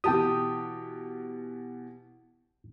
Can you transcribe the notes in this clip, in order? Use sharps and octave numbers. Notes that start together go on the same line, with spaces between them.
B2 E3 G4 G5 A5 D#6